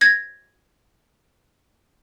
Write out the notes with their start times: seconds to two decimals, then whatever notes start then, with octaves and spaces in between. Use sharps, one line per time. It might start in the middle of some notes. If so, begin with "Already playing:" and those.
0.01 G#6 A#6